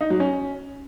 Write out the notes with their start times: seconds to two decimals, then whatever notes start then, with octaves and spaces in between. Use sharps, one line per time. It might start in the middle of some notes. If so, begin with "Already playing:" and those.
0.01 D#4
0.10 F#3
0.20 C#4